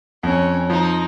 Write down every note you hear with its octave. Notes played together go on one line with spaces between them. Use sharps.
F2 C#4
F3 D#4